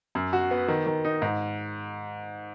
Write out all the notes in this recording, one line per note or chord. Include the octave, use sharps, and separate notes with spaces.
F#2
F#4
B3
D#3
D#3
D#4
G#2